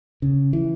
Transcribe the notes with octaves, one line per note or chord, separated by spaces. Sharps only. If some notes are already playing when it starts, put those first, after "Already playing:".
C#3
E3